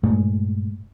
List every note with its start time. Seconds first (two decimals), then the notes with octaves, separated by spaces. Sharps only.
0.03 G2 A#2 G#3 A3